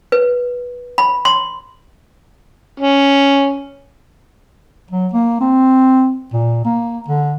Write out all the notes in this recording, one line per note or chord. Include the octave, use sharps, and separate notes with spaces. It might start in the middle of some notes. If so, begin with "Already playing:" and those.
B4
B5
C6
C#4
F#3
A#3
C4
A#2
A#3
D3